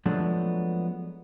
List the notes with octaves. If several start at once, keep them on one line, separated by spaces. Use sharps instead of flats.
F3 F#3 G#3 A3 B3 D4